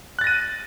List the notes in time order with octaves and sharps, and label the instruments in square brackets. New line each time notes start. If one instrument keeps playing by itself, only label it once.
[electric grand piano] F#6
A6
A#6
D#7